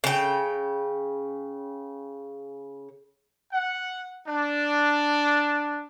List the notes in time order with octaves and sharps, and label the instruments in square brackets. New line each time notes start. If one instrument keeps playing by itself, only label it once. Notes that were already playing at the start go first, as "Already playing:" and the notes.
[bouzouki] C#3 G5
[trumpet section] F#5
D4